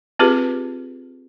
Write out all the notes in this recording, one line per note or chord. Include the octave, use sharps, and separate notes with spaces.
C4 F4 G4 G#4 B4